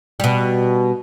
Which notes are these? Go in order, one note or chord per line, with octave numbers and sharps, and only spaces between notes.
B2 G3